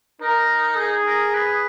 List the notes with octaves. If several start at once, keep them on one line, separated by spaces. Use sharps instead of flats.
D#4 A#4
G#4
A#4
B4